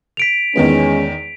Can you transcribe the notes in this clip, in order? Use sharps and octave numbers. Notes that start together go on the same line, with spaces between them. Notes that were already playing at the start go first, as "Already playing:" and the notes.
B6 D7 F7
E2 D#3 G#3 B3 C#4